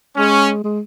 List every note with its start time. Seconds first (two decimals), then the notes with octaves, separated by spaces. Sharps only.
0.17 G#3 C#4
0.64 G#3